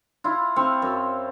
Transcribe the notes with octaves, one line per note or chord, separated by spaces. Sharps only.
E4 F4
C4 E4 F5 C#6
F#2